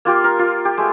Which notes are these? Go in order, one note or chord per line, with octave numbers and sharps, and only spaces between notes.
A#3 F4 G4
A#4
F4
G4
G#3 A3